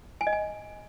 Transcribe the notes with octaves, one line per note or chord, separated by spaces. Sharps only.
G#5
D#5
G#5